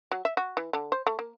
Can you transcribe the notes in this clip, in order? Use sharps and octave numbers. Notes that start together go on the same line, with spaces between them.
F#3
E5
F#4
E3
D3
C5
A3
A#3